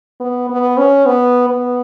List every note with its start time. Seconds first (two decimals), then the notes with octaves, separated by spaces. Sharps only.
0.20 B3
0.49 B3
0.78 C#4
1.06 B3
1.49 B3